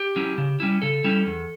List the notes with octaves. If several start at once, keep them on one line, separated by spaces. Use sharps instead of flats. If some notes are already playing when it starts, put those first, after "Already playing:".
Already playing: G4
F#3 C#4 E4
C#3
G3 C#4 E4
C#3 A4
G3 C#4 E4
E2